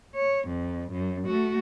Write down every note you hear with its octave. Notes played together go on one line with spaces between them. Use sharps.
C#5
F2
F#2
A3 F#4